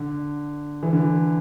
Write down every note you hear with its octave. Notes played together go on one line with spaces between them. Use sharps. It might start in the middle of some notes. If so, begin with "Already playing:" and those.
Already playing: D3
E3
D3
E3